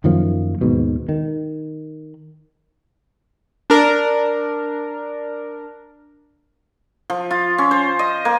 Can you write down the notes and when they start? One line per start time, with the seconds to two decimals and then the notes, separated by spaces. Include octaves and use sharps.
0.04 F#2 D#3 F3 A#3
0.61 D#2 G#2 B2
1.09 D#3
3.70 D4 A#4
7.10 F3
7.31 F4
7.58 C#4
7.71 C5
7.99 D#5
8.25 A#3